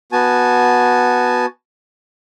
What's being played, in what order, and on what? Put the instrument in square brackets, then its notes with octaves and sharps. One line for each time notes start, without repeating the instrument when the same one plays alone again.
[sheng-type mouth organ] B3 F#4 G#5 A5